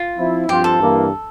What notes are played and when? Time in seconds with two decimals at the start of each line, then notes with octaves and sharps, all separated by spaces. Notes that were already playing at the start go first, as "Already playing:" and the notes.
Already playing: F4
0.18 F3 C4 E4
0.48 G2 F3 C4 F4 G4 C5
0.64 A4
0.79 G2 E3 A#3 E4